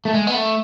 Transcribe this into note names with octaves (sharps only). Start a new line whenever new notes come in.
A3
G#3
B3
A3